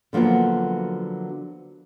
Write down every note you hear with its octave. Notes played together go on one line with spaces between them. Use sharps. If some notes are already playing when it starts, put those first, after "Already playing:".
D3 F3 F#3 A#3 B3